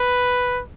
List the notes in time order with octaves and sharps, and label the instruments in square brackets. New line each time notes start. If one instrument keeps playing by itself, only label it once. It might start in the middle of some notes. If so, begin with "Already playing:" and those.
Already playing: [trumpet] B4